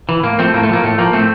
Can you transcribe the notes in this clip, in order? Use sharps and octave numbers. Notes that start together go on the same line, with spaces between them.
E3
A2 A#3
F3 A3 C4
A2 A#3
A3
F3 A#3
A2 A3
F3 A#3
A2 A3 C4